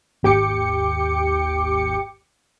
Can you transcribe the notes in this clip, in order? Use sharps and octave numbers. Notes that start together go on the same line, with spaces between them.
G#1 D#2 G4 G5 D6 C#7